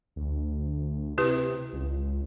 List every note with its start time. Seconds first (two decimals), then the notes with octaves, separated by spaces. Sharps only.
0.16 D2
1.18 C3 E4 G4 B4
1.73 C#2